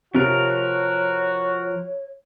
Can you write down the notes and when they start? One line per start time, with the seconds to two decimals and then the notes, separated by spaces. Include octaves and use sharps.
0.15 C3 F3 F#4 A#4 C#5